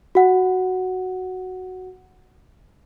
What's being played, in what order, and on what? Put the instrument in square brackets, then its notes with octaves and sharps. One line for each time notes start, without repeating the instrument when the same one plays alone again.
[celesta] F#4 F#5